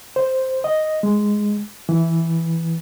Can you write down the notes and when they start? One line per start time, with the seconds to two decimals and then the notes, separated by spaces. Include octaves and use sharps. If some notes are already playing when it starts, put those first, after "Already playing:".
0.16 C5
0.64 D#5
1.03 G#3
1.89 E3